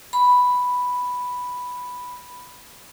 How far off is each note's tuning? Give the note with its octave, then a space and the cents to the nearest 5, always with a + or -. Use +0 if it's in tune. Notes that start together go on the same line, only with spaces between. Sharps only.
B5 +0